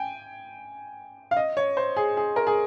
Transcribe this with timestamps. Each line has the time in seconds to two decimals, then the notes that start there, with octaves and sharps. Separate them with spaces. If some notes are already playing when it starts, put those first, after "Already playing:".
Already playing: G5 G#5
1.31 F5
1.37 D#5
1.57 C#5
1.77 C5
1.96 G#4
2.17 G#4
2.36 A#4
2.47 G#4